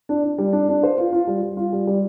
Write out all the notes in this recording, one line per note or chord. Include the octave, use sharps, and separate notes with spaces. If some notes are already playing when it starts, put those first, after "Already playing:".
D4
D4
G3
D4
D4
C5
F4
F4
G3
G3
F4
G3
G3